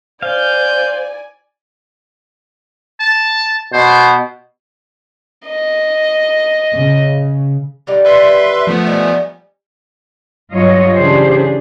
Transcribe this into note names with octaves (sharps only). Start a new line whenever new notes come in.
C5 D5 F5 G#5 G6
A5
B2 C5
D#5
C#3
D3 D#3 G3
B4 E5 C6
F3 A3 B3
G3 D#4 G#5
G2 F#3 F4 C#5 D#5
C#3 E3 D4 G4 G#4 C5